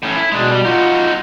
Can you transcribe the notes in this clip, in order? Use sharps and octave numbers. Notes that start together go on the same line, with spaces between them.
A2 C#4
E4
B2 G#3 D4
G3
D#4 F4 F#4